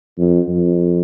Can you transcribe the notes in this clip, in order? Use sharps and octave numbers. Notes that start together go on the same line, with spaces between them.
F2
F2